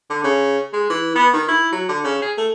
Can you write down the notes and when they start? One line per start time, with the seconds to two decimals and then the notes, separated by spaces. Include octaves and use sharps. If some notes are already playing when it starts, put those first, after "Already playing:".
0.10 D3
0.24 C#3
0.73 G#3
0.90 E3
1.16 B3
1.33 D#3
1.49 E4
1.72 F#3
1.89 D3
2.04 C#3
2.22 G#4
2.37 A3